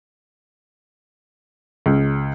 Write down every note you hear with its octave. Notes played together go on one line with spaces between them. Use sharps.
C#2